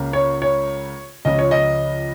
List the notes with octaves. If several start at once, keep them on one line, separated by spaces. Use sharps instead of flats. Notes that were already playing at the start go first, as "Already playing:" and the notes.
Already playing: C#2 C#3 A#3 C#4
C#5
C#5
C#2 C#3 F3 D#5
C#5
D#5